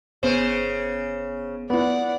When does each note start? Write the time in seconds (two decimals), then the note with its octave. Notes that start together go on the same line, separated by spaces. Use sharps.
0.23 G1 C#3 B3 C5
1.70 B3 E4 D5 F#5